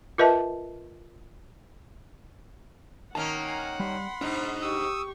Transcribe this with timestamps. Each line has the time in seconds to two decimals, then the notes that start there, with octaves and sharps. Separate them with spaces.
0.18 F4 A#4 B4 D#5 E5 A5
3.15 D#3 A#3 C#4 A#4 F#5 A5
3.48 G#5 A#5
3.80 G3 B5 C6
4.21 G#2 B2 D4 D#4
4.62 G4 C#6 D#6 E6